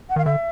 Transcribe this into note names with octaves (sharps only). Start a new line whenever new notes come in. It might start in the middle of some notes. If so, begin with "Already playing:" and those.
F#5
D#3 F5
D3 E5